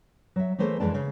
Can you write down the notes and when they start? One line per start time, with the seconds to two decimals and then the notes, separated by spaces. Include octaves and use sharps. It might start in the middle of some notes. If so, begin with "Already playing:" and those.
0.36 F#3 E5
0.59 E3 A3 A#3 G#4 C5 C#5
0.80 F2 E3 G#3 A4 D5 A5
0.94 C#3